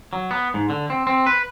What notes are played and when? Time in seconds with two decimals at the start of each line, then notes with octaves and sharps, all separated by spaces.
0.13 F#3
0.31 B3
0.54 G#2
0.70 D3
0.90 C4
1.07 C4
1.26 B4